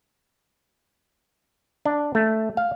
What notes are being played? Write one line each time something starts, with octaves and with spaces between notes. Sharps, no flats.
D4
A3
F5